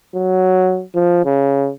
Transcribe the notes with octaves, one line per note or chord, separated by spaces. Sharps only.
F#3
F3
C#3